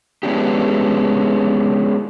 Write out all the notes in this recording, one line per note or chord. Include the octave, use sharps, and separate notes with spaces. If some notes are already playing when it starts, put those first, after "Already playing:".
G#3 B3 C#4 D4 E4 G4